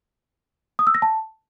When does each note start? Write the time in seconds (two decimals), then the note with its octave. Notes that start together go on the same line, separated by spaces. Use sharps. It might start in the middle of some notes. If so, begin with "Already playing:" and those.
0.79 D#6
0.87 E6
0.95 A#6
1.02 A5